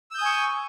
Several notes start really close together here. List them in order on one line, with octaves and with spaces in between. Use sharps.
E6 G6 D#6 G#5 C#6